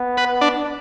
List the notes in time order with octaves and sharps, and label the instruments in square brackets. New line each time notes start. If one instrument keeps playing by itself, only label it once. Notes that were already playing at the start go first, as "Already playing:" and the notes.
Already playing: [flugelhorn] B3
[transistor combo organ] B4
D4